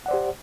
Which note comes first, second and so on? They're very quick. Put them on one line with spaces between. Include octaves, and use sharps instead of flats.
F#5 D5 C5 G4